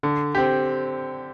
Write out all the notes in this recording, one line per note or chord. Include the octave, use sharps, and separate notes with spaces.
D3
C4 G4